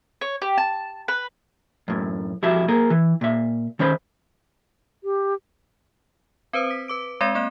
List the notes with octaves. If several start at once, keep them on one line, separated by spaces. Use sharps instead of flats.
C#5
G4
A5
B4
F#2 A2
F2 E4 F#4 G4 E5 A5
A#3 G#4 A#4
E3
A#2 E5
D#3 C#4 C5 B5
G4
C4 B4 C5 D#6
B6
B4 D6 D7
G#3 C4 D5 C6 A#6 D#7
A#3 C4 F#6 E7